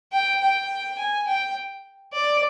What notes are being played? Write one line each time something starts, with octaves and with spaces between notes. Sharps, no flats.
G5
G5
G#5
G5
D5